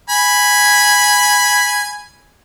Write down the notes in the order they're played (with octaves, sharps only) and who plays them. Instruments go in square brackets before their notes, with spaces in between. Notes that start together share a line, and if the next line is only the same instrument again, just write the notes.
[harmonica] G#5 B5